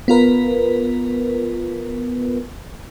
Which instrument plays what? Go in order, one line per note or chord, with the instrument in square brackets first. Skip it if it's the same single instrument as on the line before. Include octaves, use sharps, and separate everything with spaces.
[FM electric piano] B3 F4 A#4 B4